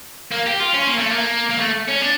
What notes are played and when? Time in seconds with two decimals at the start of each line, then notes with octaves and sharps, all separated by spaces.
0.31 A#3
0.46 G4
0.60 F4
0.74 C#4
0.87 A#3
0.99 A3
1.11 A#3
1.50 A#3
1.60 A3
1.88 C#4
2.01 D4